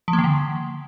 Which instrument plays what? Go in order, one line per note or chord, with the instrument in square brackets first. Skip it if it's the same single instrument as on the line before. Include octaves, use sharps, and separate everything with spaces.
[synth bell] F3
A#3
D#3
D3